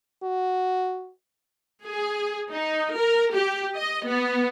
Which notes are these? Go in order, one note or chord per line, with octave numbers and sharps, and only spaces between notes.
F#4
G#4
D#4
A#4
G4
D#5
B3